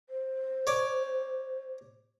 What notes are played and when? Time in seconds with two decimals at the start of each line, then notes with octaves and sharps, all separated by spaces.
0.09 C5
0.67 C#5 D5